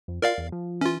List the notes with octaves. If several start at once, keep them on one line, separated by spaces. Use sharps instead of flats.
F2
F4 A#4 D5 F5
E2
F3
E3 C#4 F4